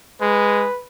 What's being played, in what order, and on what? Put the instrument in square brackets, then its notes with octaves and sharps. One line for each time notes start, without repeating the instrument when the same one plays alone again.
[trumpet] G#3 [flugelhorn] B4